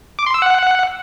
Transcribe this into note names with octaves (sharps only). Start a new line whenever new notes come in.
D6
C6
E6
F#5